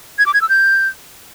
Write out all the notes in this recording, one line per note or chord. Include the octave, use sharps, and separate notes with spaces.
G#6
D6
G#6
E6
G6